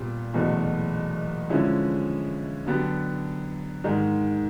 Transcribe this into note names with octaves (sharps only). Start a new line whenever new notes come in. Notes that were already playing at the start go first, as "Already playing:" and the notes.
Already playing: A#2 G3 B3
F#1 E2 B2 F#3 A3
D3 F3 G#3 C#4 E4
D3 F#3 B3 D4 G4
G#2 D#3 G#3